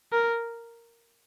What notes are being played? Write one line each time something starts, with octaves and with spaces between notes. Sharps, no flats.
A#4